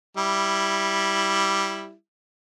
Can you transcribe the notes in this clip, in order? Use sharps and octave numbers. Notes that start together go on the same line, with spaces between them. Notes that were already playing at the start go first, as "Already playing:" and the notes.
G3 E4